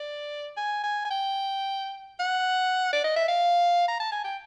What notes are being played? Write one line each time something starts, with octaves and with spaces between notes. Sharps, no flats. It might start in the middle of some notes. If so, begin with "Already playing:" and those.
Already playing: D5
G#5
G#5
G#5
G5
F#5
D5
D#5
E5
F5
A#5
A5
G#5
G5